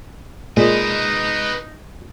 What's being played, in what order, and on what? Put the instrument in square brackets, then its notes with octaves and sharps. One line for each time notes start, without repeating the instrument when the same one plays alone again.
[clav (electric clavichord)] A#2 [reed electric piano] G#3 [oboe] D#4 [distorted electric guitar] B4 D#5